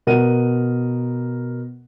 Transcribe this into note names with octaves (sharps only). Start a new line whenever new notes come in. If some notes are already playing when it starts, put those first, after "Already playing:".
B2 A#4 F#5 D#7